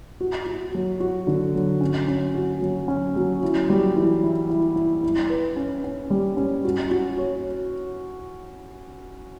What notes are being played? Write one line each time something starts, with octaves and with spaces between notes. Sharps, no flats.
F#4
F#4
F#3
F#4
D3
F#3
C#4
C#4
F#4
F#3
C#4
F#3
E4
G3
E3
E4
E4
E4
E4
B4
C#4
C#4
G3
C#4
F#4
F#4
C#5